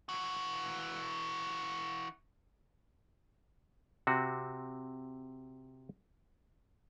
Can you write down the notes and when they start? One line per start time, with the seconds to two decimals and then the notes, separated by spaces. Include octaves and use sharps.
0.09 E3 F#4
4.07 C3 C4 F#4